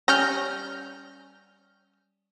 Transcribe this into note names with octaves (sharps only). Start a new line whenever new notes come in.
G3 C#4 F6 G6 A#6